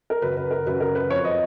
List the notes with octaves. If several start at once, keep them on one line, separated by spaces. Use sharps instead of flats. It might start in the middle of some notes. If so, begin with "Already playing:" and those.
A#4
F#2 C#3 F#3 B4
B4
A#4
F#2 C#3 F#3 B4
A#4
B4
F2 F3 C#5
D#5